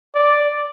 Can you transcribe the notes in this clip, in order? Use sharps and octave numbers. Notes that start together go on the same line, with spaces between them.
D5